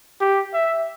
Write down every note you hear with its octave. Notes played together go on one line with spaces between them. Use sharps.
G4
E5